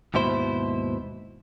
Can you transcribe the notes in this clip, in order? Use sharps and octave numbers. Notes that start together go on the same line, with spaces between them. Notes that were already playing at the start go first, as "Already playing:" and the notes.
D#2 G#2 B2 E4 C5